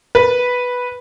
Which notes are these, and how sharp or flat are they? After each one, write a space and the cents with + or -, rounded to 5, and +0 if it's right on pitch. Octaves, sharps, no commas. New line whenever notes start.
B4 -5